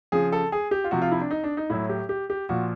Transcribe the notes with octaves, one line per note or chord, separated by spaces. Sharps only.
C#3 F3 G#4
A4
G#4
G4
F4
C3 F3 F#4
F4
E4
D4
D#4
D4
D#4
A2 F#3 E4
G4
G4
G4
A#2 F3 F#4